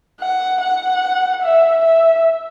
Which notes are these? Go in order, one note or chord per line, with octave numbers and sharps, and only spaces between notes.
F#5
F#5
E5
E5